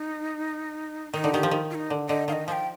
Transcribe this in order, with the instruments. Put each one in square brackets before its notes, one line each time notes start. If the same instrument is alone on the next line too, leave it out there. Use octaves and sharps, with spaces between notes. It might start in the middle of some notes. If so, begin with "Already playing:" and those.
Already playing: [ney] D#4
[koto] D#3 [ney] D#4
[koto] D3
[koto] D#3 [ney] G4
[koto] F3
D#3
[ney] F4
D#4
[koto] D3
[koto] D3 [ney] D#5
[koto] D#3 [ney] F5
[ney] D#5
[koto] F3 [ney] G5 A5